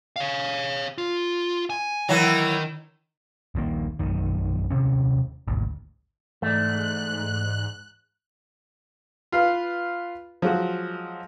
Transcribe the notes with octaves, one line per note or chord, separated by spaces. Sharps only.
C#5 F5
F4
G#5
D#3 E3 F#3 A#4
D#1 A#1 D#3 A#3
A#1 F#2 D#3
D#1 C3 C#4
G#1 D2
G#2 E3 A3 D5 F#6
F4 B4 F5
F3 F#3 G#3 F#4